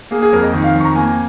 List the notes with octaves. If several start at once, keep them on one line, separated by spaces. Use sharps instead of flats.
A#3 G#4
G#4
F2 A#4
D#5
D#3
F5
F2
C#6
A#5
A#3 G#5